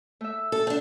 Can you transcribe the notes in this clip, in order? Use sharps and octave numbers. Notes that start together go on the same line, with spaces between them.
A3 E5
A4
C4 D4